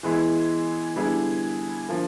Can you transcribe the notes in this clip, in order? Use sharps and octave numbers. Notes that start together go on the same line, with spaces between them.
E3 G#3 B3 E4 G#4
D3 G3 B3 E4 G#4
D3 F3 A#3